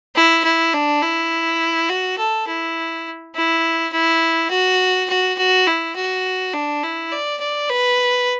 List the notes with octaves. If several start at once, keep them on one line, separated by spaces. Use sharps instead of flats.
E4
E4
D4
E4
F#4
A4
E4
E4
E4
F#4
F#4
F#4
E4
F#4
D4
E4
D5
D5
B4